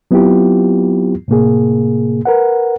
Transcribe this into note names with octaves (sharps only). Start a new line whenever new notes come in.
F#3 B3 C4 E4 F4 G4
A2 C3 A#3 G#4
A#4 B4 F#5